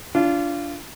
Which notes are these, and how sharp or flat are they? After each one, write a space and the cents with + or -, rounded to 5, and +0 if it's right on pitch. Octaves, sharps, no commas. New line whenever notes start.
D4 -20 F4 -20